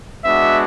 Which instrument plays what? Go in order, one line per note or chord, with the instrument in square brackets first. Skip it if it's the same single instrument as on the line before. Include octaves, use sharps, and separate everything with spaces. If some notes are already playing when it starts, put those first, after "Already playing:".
[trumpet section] G#3 B3 D4 F#4 E5